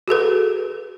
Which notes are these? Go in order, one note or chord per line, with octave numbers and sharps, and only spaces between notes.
F#4 G#4 A4 B4